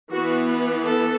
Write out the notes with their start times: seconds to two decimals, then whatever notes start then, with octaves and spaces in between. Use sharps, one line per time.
0.10 E3 B3 F#4
0.84 A4